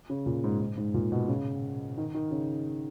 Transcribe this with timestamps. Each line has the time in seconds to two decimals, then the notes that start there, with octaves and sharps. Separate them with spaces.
0.10 C#3
0.26 A#2
0.44 G#2
0.60 G#2
0.77 G#2
0.94 A#2
1.12 B2
1.28 C#3
1.97 D#3
2.14 D#3
2.31 C#3